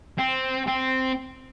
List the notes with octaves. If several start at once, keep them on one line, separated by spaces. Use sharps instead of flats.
C4
C4